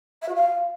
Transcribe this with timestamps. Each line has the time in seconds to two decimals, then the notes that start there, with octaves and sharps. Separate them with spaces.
0.22 E5
0.28 F#4
0.35 F5